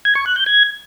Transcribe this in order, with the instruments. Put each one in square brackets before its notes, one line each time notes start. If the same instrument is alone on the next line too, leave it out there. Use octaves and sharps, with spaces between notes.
[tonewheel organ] G#6
C#6
F#6
G6
G#6